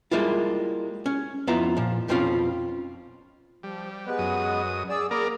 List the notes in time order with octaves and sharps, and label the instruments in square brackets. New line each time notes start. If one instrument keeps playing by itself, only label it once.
[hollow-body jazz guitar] G3 G#3 A#3 E4 F4
C#4
F2 B3 E4 F4 A#5
A#2 F3
B1 F2 B2 C4 C#4 F4
[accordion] F3 [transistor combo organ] G3
[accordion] G#3 B3 B4
[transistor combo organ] F#2 D#6
[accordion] G#4 D5 E6
[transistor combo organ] A#3 A#4 D5 [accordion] G#4 B5